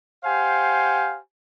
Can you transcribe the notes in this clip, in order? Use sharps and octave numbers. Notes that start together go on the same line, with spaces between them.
G4 C5 F5 F#5 G#5